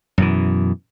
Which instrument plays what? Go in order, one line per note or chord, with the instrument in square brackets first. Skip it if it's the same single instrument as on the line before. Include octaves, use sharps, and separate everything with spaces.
[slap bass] F#2 B2 E3